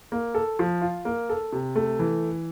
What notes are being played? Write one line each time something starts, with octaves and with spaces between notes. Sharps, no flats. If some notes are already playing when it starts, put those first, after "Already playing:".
A#3
A4
F3
F4
A#3
A4
C3
A3
E3